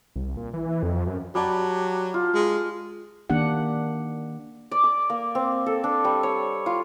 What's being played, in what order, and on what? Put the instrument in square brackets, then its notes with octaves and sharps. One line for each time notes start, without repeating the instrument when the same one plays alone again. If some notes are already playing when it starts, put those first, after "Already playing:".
[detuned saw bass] C2
A#2
E3
F2
F#2
[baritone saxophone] F#3 [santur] G3 G4 A5
[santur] F4
[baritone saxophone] G#3
[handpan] D#3 A#3 D4 G4 F#5
[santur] D5
D6
A#3
C4
A4
D4
G3
C#5
F4